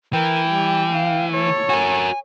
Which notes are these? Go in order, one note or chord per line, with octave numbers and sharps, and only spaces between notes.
E3 A#4 G5
G3
F5
A4 C#5
F#4 A#4 G#5